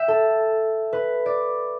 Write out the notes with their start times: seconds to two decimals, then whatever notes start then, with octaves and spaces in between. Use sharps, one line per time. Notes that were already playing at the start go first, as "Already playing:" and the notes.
Already playing: E5 G5
0.08 A4
0.93 B4
1.26 D5